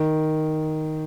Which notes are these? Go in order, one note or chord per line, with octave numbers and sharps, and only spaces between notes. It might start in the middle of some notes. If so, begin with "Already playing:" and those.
Already playing: D#3